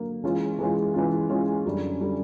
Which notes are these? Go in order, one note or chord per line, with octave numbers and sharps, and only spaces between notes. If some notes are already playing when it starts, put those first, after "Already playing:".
Already playing: D3 F#3 A#3
E3 G#3 C#4 F4
E3 G#3 C#4 F4
E3 G#3 C#4 F4
E3 G#3 C#4 F4
F#2 D3 G3
D3 G3